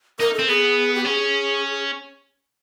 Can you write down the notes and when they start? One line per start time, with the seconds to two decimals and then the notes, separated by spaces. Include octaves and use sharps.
0.19 D#4 A#4
0.34 C4 A4
0.48 B3 G#4
0.95 G4
1.05 C#4 G#4